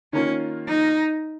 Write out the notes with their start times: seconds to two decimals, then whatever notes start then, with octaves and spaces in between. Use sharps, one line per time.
0.13 D#3 A#3 C#4 F4
0.67 D#4